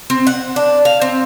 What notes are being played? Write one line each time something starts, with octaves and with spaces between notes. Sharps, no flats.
C4
F#5
D4
F5
C4